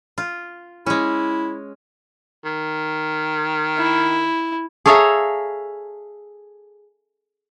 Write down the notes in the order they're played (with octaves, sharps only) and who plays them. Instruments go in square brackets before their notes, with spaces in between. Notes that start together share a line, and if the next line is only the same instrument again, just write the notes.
[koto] F4
[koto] G#3 C#4 [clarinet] E4
[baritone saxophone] D#3
[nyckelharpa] E4
[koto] G#4 A4 C#5 E5 F5 A#5